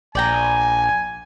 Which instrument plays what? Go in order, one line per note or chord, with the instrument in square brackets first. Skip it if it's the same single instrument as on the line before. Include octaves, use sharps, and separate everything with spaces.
[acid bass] A#1 [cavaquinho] D5 G5 A#5 [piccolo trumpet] G#5